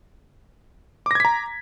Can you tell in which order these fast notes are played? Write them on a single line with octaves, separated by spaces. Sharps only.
D6 A#6 G#6 B6 A#5